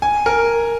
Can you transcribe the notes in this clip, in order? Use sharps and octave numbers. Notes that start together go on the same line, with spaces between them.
G#5
A#4